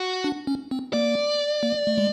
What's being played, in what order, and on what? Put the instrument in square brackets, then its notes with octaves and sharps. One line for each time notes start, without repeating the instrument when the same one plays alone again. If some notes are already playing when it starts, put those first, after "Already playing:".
Already playing: [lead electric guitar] F#4
[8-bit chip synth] D4
C#4
C4
[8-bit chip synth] A#3 [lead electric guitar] D5
[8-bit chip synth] A#3
A3
G#3